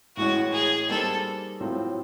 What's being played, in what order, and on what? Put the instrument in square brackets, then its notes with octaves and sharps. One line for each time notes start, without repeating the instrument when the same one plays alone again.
[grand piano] A2 E3 G#3 C#4 [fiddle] F#4
[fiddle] G#4
[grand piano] G3 A#3 D#4 G#4 C5 [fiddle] A4
[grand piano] A2 F#3 A3 C4 F4